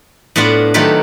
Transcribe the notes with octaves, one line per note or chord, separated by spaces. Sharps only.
A2 B3 D4 F4 F#5
D#3 F#3 A3 F4 G4 B4